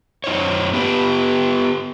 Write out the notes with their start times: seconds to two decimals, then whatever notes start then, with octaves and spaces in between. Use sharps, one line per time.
0.24 F#2 D#4 C5 C#5
0.73 B3 G4 B4